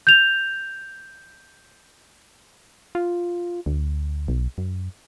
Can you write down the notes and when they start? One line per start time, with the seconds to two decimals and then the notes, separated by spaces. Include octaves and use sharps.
0.07 G6 F7
2.95 F4
3.66 D2
4.28 B1
4.58 F#2